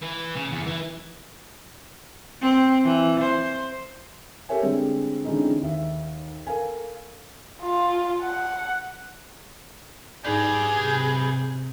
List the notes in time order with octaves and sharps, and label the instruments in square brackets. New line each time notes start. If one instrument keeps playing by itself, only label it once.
[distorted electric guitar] E3
C#3
E2
E3
[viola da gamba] C4
E3
C5
[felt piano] G4 A4 A#4 C#5 E5 G#5
D3 G3 G#3 C4
D3 E3 G#3 C4 C#4 D#4
D#2 E5
A4 A#4 F5 G#5
[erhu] F4
F#5
[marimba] G#2 D#4 D5 [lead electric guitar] G4 B4 [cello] G#4
[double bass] C3